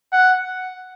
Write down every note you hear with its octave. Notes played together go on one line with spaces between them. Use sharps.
F#5